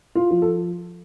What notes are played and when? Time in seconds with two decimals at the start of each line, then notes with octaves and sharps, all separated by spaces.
0.15 F4
0.31 F3
0.42 A4